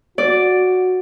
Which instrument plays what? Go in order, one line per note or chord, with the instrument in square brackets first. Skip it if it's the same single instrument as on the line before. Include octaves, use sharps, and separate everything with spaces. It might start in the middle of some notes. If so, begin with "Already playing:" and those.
[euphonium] F#4 [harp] D5